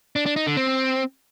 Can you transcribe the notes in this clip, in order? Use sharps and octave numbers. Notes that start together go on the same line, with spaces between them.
D4
D4
D#4
D3
C4